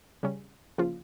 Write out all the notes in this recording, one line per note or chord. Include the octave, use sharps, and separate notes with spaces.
C#3 G3 C#4
C#3 F3 A#3 F4